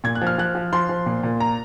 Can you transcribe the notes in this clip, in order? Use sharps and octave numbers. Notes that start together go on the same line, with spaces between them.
A#2 G#6
F#6
F3
F6
F3 F#6
F3
F3 C6
F3
A#2
A#2
A#5